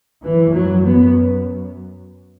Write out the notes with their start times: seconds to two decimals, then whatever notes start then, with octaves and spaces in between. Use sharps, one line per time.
0.24 F#2 E3
0.55 F#3
0.86 B3